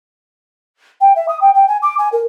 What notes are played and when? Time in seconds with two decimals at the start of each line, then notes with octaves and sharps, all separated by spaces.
1.01 G5
1.16 E5
1.29 D#6
1.41 G5
1.55 G5
1.68 G#5
1.82 D6
1.98 G#5
2.12 A#4